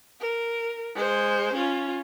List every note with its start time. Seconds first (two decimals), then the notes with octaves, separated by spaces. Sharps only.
0.21 A#4
0.95 G#3 C5
1.54 C#4 F4